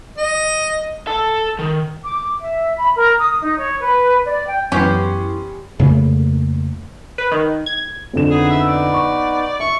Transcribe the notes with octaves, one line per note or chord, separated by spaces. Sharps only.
D#5
A4 A5
D#3
D6
E5
B5
A#4
D#6
D#4
C#5
B4
D5
G5
F#2 E3 B3 C#4 G4 C6
F2 C#3 A3 A#3
B4
D#3
G#6
F2 D3 E7
B3 D#4 G#4 B4
E5
D5
C#6
E5 C#6